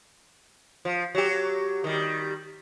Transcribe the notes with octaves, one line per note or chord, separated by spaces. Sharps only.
F3
F#3 G4
D#3 G3